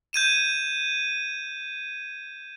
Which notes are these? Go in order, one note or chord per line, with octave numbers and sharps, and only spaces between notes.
G6 G#6 D#7 E7